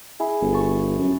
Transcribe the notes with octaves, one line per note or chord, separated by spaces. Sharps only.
E4 G#4
G1
A5 C#6
F#2